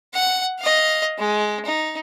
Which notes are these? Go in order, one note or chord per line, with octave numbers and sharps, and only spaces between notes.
F#5
D#5 F5
G#3
D#4